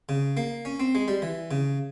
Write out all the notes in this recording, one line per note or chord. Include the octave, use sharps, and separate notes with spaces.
C#3
A#3
C#4
C4
G#3
G3
E3
C#3